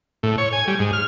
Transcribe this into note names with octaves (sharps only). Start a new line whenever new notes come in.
A2
C#5
G#5
G3
G#2
F6